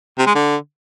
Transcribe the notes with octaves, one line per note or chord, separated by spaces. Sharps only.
C3
G#3
D3